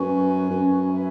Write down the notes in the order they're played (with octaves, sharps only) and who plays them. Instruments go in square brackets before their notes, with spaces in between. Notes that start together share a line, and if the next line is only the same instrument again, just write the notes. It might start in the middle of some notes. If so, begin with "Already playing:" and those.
Already playing: [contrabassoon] F#2 [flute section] B4 G#5 C#6
[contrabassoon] F#2
[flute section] B4 E5 G#5 B5